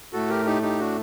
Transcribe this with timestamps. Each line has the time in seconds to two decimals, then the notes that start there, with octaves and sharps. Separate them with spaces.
0.13 A2 A3 F#4 A4
0.29 G4 A#4
0.46 D#4 G4
0.62 D#4 G4
0.79 D4 F#4